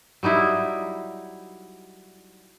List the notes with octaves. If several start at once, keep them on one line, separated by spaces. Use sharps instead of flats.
F#3 G3 D#4 E4